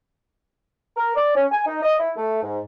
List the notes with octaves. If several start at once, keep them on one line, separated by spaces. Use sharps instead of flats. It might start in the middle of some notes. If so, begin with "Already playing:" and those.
A#4
D5
C#4
G#5
D#4
D#5
E4
A3
G#2